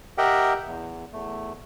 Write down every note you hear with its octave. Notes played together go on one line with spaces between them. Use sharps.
G4 A#4 D#5 E5 F#5 G5
E2
E2 A3